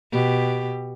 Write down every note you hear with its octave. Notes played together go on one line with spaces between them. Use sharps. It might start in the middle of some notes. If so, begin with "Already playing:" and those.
B2 G4